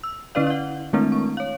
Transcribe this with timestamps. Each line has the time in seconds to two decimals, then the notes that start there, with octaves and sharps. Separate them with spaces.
0.04 E6
0.35 D3 C#4 E4 B4 D5 F5
0.47 F5 F#5
0.93 D#3 G#3 A3 C4 D4 E4
1.12 C#6
1.37 C#5 F5